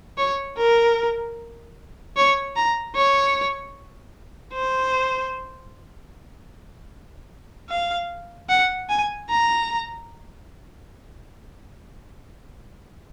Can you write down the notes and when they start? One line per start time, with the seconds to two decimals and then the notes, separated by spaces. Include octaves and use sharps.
0.18 C#5
0.58 A#4
2.16 C#5
2.56 A#5
2.96 C#5
4.54 C5
7.70 F5
8.49 F#5
8.89 G#5
9.29 A#5